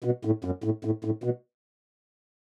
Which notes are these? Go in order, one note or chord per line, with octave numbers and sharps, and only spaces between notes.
B2
A2
F#2
A2
A2
A2
B2